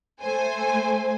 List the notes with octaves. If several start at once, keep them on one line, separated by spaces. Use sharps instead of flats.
A3 C5 G#5